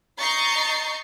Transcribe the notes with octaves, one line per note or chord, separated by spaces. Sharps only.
D#5 A#5 C#6 G6 A6 C7